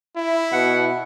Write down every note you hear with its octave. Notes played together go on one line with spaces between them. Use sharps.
E4
B2 F#5